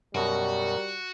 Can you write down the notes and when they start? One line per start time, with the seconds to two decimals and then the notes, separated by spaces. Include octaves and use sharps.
0.15 F#2 B2 G3 F#4 A#4